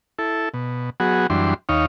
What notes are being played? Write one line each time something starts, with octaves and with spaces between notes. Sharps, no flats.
E4 A4
B2
F#3 B3 F#4 G#4
F#2 E3 G3 D4 C6
D#2 D#4 C#5 F5